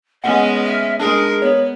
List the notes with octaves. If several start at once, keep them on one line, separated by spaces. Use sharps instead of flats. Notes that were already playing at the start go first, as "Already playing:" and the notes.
G#3 B3 C#4 D#5 F#5
E5 F6
G#3 D4 G#4 A#4
B3 C#5